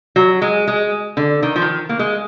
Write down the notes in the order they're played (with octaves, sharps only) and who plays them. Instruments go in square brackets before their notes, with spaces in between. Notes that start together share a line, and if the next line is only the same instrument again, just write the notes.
[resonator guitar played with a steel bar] F#3
G#3
G#3
D3
D#3
F3
D#3
A#3
G#3